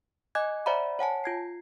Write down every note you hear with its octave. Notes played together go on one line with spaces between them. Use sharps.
D#5 G#5 D6 F#6 G#6
C5 D5 E5 F#5 A#5 B5
C#5 F#5 G#5 A5
F4 G#6 C7